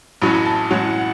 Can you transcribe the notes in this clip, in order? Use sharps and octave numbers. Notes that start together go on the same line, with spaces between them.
A1 A2 F#3 C#4 B5
B5
A5
A1 A2 F#3 C#4 F#5
F#5
F#5